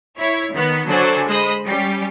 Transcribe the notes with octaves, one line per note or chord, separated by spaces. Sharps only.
E4 C#5 G#6
D#3 B3
D3 F#3 A4 C5 D5 G#5
G#3 C5 D#5 B5 D#6
G3 C#4 G4